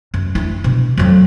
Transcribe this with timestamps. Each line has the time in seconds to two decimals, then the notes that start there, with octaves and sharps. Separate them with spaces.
0.14 F#2
0.35 D4 E4
0.64 B2
0.97 F2 F#3